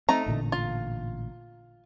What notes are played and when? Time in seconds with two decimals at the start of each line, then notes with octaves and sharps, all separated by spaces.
0.09 A3 C4 D#4 A#5
0.26 A1 A#2 D3
0.52 F4